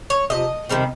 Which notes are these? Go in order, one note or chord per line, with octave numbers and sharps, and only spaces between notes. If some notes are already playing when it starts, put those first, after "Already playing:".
C#5
C3 F3 D#5
C3 D#3 G3 C4